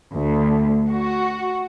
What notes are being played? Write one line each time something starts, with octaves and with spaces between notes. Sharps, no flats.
D2
F#4